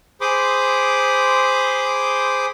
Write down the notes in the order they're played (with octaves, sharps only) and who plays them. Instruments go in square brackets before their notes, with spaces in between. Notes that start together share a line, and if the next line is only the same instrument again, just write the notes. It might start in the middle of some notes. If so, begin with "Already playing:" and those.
[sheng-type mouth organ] G#4 C5 B5 C6 D6 D#6